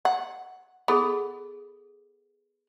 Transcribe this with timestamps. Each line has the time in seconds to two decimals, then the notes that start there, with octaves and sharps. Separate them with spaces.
0.05 F#5
0.88 B3 G#4 A4 B5